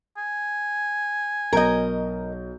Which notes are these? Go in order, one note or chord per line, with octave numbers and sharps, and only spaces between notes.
G#5
B1 A#4 D#5 G6